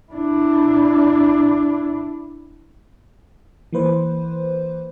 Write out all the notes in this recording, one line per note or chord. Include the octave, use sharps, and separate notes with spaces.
D4 E4
E3 A#3 B4 C5